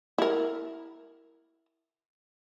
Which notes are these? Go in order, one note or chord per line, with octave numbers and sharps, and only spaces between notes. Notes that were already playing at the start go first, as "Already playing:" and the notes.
E4 A#4